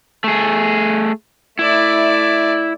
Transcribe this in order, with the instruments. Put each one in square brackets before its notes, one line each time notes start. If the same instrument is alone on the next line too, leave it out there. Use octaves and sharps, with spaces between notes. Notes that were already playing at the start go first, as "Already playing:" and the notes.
[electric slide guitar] A3 G#4
[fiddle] A3 D5 [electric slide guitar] E4